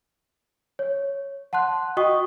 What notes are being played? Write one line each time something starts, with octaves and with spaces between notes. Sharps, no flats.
C#5
F#5 A5 C6 F#6
F#4 D#5 G5 C#6 D#6